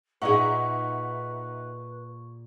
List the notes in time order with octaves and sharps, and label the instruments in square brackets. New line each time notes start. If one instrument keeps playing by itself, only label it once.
[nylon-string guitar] A#2 F#4 G#4 [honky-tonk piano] D#4 E5 F#5 [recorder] B4 [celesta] C#6